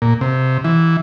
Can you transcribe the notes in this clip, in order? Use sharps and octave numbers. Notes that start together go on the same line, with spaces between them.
A#2
C3
E3